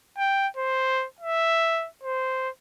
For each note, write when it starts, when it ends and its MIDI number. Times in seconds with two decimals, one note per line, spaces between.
0.18 0.48 79
0.57 1.06 72
1.20 1.88 76
2.03 2.49 72